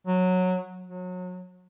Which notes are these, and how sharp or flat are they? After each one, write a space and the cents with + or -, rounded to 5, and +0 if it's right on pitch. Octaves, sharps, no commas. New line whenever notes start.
F#3 -15
F#3 -30